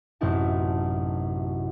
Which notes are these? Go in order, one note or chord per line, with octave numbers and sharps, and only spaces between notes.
A1 F#2 C3 D#4 E4 A5